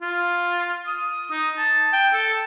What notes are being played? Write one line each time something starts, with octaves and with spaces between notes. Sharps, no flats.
F4
D#6
D#4
A5
G5
A4